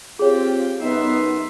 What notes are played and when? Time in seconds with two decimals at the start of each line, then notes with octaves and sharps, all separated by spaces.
0.19 C4 F4 G4 G#4 C#5 G5
0.81 F#2 B3 D#4 E5 C6